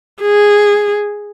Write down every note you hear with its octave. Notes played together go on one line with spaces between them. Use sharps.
G#4